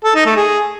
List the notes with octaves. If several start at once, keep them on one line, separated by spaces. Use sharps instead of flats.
A4
D#4
A3
G#4